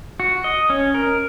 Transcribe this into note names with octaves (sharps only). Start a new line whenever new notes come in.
F#4
D#5
C#4
A#4